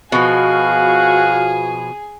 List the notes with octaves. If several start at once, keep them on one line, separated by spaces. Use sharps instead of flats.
B2 F3 F#4 G#4 F5